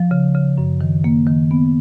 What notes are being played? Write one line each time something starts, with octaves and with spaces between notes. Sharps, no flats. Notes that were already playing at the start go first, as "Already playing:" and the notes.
Already playing: F3
C#3
C#3
F#2
D#3
A#3
D#3
B3